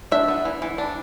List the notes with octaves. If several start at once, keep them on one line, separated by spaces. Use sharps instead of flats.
D4 E5
B3
E3
E3
D4